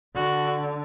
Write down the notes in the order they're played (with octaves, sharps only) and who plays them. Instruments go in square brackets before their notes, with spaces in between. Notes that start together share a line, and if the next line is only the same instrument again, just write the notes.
[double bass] D3 [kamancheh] F#4